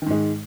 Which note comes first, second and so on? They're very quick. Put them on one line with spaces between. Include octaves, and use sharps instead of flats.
D#3 G#2 G#3